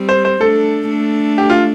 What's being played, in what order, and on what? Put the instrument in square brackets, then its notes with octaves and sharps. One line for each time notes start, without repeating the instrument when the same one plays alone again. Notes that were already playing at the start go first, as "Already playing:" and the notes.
Already playing: [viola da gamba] G3 C4
[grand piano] C5
C5
[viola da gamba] A3 D4 [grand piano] A4
[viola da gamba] A3 D4
[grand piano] G4
F4